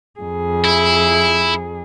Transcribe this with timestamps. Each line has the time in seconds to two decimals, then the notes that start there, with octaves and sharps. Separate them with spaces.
0.20 F2 G#4
0.65 E4